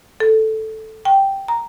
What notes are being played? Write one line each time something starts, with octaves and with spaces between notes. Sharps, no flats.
A4
G5
A#5